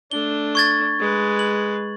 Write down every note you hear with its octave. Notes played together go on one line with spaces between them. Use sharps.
A3 D4 G7
C#6 G#6 A6
G#3 B4
F#7